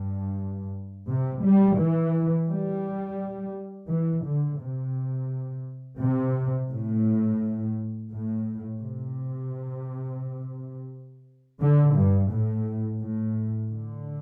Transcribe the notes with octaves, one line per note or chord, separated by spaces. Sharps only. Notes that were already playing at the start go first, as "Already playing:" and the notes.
Already playing: G2
C3
G3
E3
G3
E3
D3
C3
C3
A2
A2
C3
D3
G2
A2
A2
D3